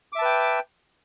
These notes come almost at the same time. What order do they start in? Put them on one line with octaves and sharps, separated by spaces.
D6 E5 A5 B4 G5